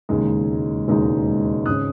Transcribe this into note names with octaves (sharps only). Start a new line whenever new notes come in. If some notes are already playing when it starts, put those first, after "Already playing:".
E1 D#2 C#3 G#3 D#4
E1 D#2 C#3 G#3 D#4
G#1 C#3 G#3 C#4 D#6 F#6